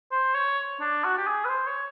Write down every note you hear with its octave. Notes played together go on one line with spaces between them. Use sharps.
C5
C#5
D4
F#4
G4
G#4
B4
C5
C#5